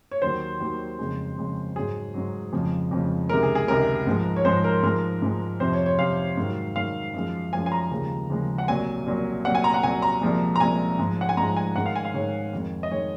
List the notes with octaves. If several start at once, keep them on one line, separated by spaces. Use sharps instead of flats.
C#5
D#2 D#3 F#3 C5
D#2 D#3 F#3
F2 C#3 G#3
F2 C#3 G#3
G#2 F#3 G#4
G#2 F#3
F2 C#3 F3 G#3
F2 C#3 F3 G#3
C#2 C3 D#3 G#3 A#4
G#4
G#4
C#2 C3 D#3 G#3 A#4
G#2 F3 G#3
C#5
G#2 F3 G#3 C5
A#4
G#2 F3 G#3 A#4
G#2 F3 G#3
F2 C3 F3 C5
C#5
C#5
F2 C3 F3 F5
G#2 D#3 F#3
G#2 D#3 F#3 F5
F#2 F3 G#3
F#2 F3 G#3 G#5
G#5
A#5
D#2 C#3 F3 G#3
D#2 C#3 F3 G#3
F#5
C2 A#2 F#3 G#5
C2 A#2 F#3
C2 A#2 F#3 F#5
G#5
A#5
F#5
C2 A#2 F#3 G#5
A#5
C2 A#2 F3 G#3
A#5
C2 A#2 F3 G#3 G#5
G#2 F3 G#3
F#5
G#5
G#2 F3 G#3 A#5
G#5
G#2 D#3 G#3 F#5
F5
G#5
F5
G#2 D#3 G#3 C#5
F2 D#3 G#3
D#5
D#3 G#3 C#5